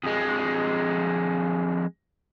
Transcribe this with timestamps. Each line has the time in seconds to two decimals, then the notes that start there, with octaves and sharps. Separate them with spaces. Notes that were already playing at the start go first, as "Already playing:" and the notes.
0.04 F2 G#3